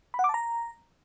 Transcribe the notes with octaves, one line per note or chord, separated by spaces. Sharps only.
B5
F#5
D6
A5
A#5